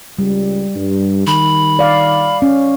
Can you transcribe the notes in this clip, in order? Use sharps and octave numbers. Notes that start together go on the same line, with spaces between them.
C#2 G3
G2
D#3 B5
D5 F5
C#4